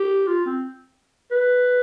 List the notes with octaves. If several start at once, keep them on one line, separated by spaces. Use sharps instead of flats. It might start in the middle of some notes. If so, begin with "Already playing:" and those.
Already playing: G4
F4
C4
B4